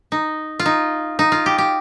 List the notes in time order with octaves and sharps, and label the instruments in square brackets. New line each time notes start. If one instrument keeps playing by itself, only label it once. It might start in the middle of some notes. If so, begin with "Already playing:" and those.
[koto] D#4
F4
D#4
D#4
F4
G4
G4